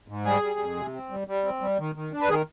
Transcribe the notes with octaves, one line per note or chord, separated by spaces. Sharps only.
G#2
G3 G#4
G3
F2
C3
C4
G3
G3
C4
G3
D#3
D#3
D4
B4
D#3 G#4